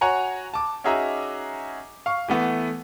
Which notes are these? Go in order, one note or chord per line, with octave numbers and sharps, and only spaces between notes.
F#4 C#5 F#5 G#5 A#5
A5 D6
C#4 D#4 F#4 G#4 E5 A#5
F5 C#6
E3 A3 B3